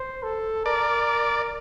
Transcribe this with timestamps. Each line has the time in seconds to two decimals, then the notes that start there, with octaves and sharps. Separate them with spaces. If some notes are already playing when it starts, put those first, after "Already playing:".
Already playing: C5
0.23 A4
0.65 A#4 D5